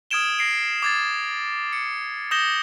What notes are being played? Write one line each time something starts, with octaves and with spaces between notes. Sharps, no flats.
D#6 F6 G#6 D7 E7 G7
A#6 C7 D7
D6 G#6 A6
C#7
D#6 G6 A#6 E7 G7